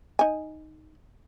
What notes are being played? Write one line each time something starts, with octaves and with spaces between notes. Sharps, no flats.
D#4 G#5